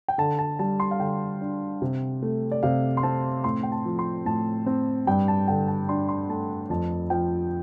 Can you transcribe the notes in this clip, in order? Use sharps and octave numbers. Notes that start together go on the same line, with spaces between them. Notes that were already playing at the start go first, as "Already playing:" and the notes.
G5
D3 A5
A5
G3 A5
C6
F5
D3 G5
D4
C3
A3
D5
C3 F5
C6
C4 A5
A2 C6
G5
A5
F3
C6
A2 A5
C4
G2 G5
A5
D3 G5
A5
D4 C6
C6
A3 A5
F2 A5
F3 G5